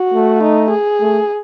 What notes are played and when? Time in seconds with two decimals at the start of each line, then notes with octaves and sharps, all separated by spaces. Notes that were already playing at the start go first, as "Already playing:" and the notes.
Already playing: F#4
0.13 A3
0.42 D#4
0.71 G#4
1.00 A3